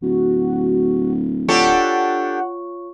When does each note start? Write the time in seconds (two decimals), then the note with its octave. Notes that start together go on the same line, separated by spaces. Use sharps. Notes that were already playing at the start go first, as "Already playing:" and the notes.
0.02 D1 F#4
1.49 D4 F4 G4 A4 C#5 F#5 C#6